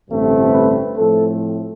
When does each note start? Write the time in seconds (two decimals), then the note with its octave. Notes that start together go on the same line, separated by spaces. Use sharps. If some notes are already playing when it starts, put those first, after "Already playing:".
0.09 A1 G2 D3 A3 C4
0.53 B4
0.96 A2 F3 A3 C4 A4